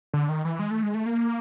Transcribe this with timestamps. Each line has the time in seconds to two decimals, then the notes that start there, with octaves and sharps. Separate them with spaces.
0.14 D3
0.29 D#3
0.45 E3
0.59 G#3
0.71 A3
0.83 G#3
0.94 A3
1.06 A#3